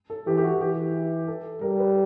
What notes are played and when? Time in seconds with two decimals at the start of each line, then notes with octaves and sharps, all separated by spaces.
0.10 A4
0.26 E3 G4
0.37 G4
0.44 F#4
0.61 E3 G4
1.28 A4
1.61 G3 A#4
1.79 B4